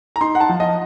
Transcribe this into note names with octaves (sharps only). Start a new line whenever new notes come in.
A#5
D#4 C6
F#5
A5
F3
D#5